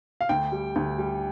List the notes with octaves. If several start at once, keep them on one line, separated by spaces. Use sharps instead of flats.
F5
D2 G5
G3
D2
G3